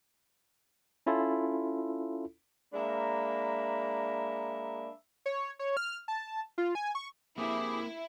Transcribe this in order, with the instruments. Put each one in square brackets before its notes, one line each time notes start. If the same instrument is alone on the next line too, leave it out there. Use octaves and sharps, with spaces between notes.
[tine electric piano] C#4 E4 F4 A4
[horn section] G#3 A#3 D4 E5 A#5 B5
[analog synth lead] C#5
C#5
F6
A5
F4
G#5
C#6
[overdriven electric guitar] A#3 C4 [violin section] E4 [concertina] G4 G#4